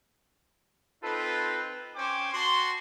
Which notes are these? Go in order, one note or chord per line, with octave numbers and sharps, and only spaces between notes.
C4 D#4 F4 A4 B4
C#4 C5 G5 D6
F#4 A5 C6